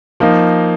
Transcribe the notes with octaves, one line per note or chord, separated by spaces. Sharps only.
F3 A#3 D#4